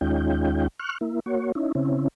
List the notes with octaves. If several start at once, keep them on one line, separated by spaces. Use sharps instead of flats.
D#2 G#3 C#4 D#4 F4 G5
C#6 F6 F#6
A#3 E4
A#3 F#4 C#5
C#4 D#4 E4
C#3 C4 C#4 E4